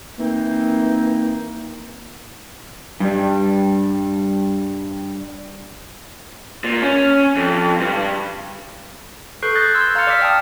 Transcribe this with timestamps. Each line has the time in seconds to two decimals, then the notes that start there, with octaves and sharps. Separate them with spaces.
0.19 E3 A#3 C4 D#4
3.00 G2 G3
6.64 A#2
6.82 C#4
7.36 F2
7.80 G2
9.42 A4 B4 C#6 F#6 G6 C7
9.55 D#6 F#6 G6 A6 A#6 C7
9.73 C6 E6 G6 G#6
9.95 F5 A#5 E6 F6 A6 C#7
10.07 D5 D6 E6 F6 B6
10.22 G5 A5 D#6 F6